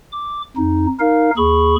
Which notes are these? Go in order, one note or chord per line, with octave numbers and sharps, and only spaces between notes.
D6
F2 D#4
D#4 A#4 F5
D#2 G#4 B5 C#6